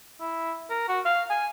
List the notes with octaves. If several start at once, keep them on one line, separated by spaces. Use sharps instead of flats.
E4
A#4
F#4
F5
G#5